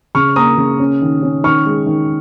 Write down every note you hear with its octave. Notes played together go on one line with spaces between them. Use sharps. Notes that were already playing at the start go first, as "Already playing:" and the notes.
C#3 C#6 F6
A#3 A#5 D#6
C#3
C#4
D#3
C#4
D#3 C#6 F6
G#3
D#3